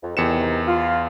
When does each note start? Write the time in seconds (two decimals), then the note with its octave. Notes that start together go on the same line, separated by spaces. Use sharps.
0.03 F2
0.17 E2 C3 D#3 C#7 E7
0.68 F4